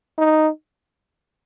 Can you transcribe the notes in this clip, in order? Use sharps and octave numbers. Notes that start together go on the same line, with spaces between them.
D#4